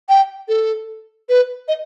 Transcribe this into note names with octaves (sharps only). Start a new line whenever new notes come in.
G5
A4
B4
D#5